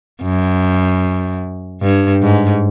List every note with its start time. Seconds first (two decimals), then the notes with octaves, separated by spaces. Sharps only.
0.23 F#2
1.82 G2
2.22 G#2